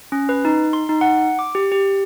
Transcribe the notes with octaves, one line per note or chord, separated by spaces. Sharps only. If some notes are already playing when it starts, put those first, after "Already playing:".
C#4
B4
D#4
C6
D#4
F#5
D6
G4
G4